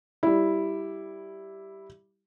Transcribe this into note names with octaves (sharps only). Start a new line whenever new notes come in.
G3 E4